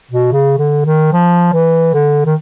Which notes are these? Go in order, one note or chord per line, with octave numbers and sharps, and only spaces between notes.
B2
C#3
D3
D#3
F3
E3
D3
D#3